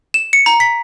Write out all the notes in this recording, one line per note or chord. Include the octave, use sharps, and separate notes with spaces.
E7
C#7
A#5
B6